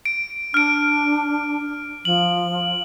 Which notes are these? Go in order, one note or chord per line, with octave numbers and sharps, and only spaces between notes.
D7
D4 F6 D7
F3 F#7